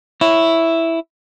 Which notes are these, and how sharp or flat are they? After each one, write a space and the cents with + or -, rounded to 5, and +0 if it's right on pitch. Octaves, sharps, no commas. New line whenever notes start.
E4 +0 C#5 +0